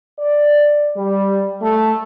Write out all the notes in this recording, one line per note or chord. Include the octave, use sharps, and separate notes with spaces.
D5
G3
A3